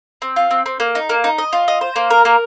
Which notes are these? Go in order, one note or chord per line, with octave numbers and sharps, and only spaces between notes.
C4
F4
C4
C4
A#3
D#4
A#3
D#4
D#5
F4
D#5
C5
A#3
A#4
A#3